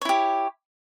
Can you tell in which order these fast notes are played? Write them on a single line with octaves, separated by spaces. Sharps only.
C#5 E4 G4